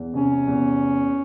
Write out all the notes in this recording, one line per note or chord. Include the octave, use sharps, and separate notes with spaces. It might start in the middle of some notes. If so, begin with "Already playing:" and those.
Already playing: E2
C3 C#4
E2